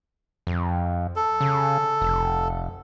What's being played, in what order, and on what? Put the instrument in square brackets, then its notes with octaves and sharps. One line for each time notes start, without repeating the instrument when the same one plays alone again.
[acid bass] F2
[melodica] A4
[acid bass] C#3
F1